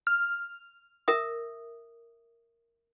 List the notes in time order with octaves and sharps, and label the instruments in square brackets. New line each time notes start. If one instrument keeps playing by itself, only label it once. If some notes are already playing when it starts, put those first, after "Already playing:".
[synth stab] F6
[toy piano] A#4 E5 D#6